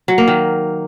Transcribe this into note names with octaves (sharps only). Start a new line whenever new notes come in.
F#3
A#3
D#3